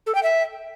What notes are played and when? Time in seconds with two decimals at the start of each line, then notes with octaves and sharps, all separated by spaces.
0.07 A4
0.15 G5
0.23 E5